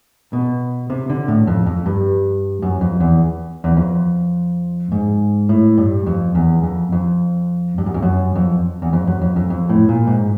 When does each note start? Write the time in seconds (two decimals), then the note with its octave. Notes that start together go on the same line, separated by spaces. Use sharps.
0.33 B2
0.90 C3
1.10 D3
1.28 A2
1.47 F2
1.66 F2
1.86 G2
2.62 F#2
2.81 F2
3.00 E2
3.64 E2
3.77 F2
4.92 G#2
5.49 A2
5.78 G2
6.06 F2
6.35 E2
6.63 F2
6.92 F2
7.78 G2
7.86 F#2
7.94 F2
8.02 F#2
8.36 F2
8.82 E2
8.93 F2
9.07 F#2
9.21 F2
9.36 F2
9.50 F2
9.69 A2
9.89 A#2
10.07 G#2